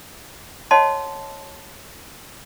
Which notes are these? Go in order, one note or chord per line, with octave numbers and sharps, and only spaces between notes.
C#5 D#5 F#5 A5 C6